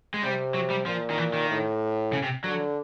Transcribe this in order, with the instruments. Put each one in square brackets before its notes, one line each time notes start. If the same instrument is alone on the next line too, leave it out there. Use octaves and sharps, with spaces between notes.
[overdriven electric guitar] G#3
[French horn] C3 [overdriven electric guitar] G3
[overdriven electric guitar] F#3
G3
[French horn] A#2 [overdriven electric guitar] F3
[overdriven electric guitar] D#3
E3
D#3
[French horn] A2
[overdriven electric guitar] C#3
C3
[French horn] D3 [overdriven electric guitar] F#3